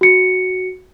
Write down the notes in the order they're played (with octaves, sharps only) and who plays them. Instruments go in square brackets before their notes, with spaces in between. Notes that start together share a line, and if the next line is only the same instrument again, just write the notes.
[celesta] F#4 C#7